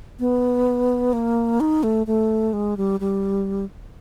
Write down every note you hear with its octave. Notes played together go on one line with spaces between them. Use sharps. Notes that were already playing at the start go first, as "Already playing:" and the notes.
B3
A#3
D#4
A3
A3
G#3
G3
G3